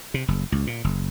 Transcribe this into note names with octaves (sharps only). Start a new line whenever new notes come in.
C3
F#1
C#2
A#2
F#1